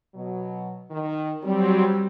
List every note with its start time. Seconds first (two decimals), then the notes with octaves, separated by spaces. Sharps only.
0.15 B2 F#3
0.91 D#3
1.44 F#3 G3 C4